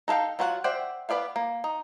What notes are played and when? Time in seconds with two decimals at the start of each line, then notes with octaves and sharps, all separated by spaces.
0.08 D#4 A4 A#4 F5 G5
0.39 F#3 F4 F#4 A4 F#5
0.64 C5 D5 E5 F#5 G5
1.09 B3 B4 D5 E5 F5
1.36 A#3
1.64 D#4